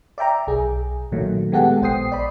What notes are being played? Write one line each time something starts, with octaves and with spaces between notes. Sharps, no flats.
D5 E5 G5 A#5
B1 G#4
A#2 D#3 F#3 A3 A#3
G#3 B3 G4 A4 F#5
A#1 C5 G5 D#6 C7
D5 B5